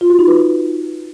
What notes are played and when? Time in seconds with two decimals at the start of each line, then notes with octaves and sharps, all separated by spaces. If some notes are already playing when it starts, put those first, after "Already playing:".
0.01 F4
0.10 F#4
0.19 D#4
0.28 B4